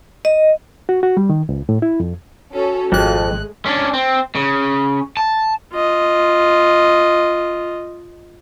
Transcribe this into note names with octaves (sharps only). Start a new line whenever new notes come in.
D#5
F#4
F#4
G3
D#3
C#2
A2
E4
F2
C#4 F#4 A4
G#1 F2 G#3 A3 F#6
C#4 D4
C4
C#3
A5
F4 D#5